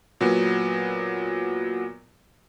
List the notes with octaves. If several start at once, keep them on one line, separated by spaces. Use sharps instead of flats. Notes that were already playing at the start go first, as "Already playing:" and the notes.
A#2 F#3 B3